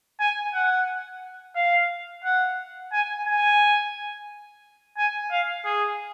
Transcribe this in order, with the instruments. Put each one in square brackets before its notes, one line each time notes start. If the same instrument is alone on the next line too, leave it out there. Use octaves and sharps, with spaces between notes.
[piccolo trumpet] G#5
F#5
F5
F#5
G#5
G#5
G#5
F5
G#4